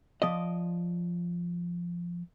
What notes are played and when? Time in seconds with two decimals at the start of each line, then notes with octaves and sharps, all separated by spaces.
0.22 F3 D5 D#5